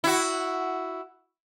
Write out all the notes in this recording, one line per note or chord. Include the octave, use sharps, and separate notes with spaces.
E4 F#4